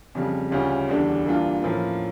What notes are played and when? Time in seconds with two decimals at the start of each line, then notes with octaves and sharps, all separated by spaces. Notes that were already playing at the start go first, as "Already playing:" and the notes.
0.15 F2 C#3 G3
0.51 D2 C#3 G3 C#4 F4
0.89 E2 D3 G3 D4
1.26 G2 E3 A#3 D4 F4
1.63 A2 F3 A#3 C#4